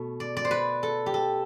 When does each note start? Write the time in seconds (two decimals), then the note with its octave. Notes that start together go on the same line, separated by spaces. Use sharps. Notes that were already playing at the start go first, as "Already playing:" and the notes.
Already playing: B2 A3
0.20 D5
0.37 D5
0.45 C5
0.51 B4
0.83 A4
1.06 G4
1.14 A4